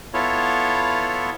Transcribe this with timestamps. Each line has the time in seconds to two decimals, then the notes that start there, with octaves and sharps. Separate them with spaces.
0.14 B3 E4 F4 A4 C#5